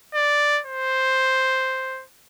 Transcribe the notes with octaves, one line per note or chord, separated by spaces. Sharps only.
D5
C5